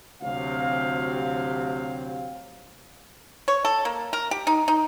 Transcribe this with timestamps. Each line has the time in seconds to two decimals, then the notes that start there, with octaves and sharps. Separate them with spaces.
0.22 D2 C3 F#3 C4 G4 F5
3.48 C#5
3.65 A4
3.85 A#3
4.13 A#4
4.31 G4
4.47 D#4
4.68 D#4